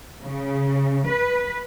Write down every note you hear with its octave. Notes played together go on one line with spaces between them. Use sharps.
C#3
B4